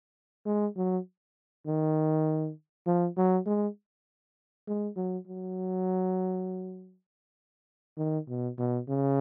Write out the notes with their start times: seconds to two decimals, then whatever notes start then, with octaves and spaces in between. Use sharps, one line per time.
0.46 G#3
0.77 F#3
1.67 D#3
2.87 F3
3.17 F#3
3.46 G#3
4.67 G#3
4.97 F#3
5.28 F#3
7.98 D#3
8.29 B2
8.59 B2
8.88 C#3